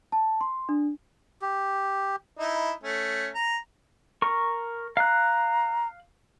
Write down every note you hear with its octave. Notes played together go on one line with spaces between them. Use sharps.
A5
C6
D4
G4
D#4 E4
A3 C#4
A#5
A#4 C#6
F5 A#5 F#6